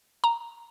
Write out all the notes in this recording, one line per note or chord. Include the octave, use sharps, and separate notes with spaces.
A#5